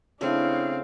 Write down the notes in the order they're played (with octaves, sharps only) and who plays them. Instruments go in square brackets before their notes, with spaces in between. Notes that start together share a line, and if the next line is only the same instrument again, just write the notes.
[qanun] C#3 A3 [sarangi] C4 [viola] D4 E4 [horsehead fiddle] F5